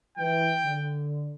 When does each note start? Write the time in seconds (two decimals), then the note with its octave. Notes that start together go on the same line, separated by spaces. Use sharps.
0.18 E3 G5
0.64 D3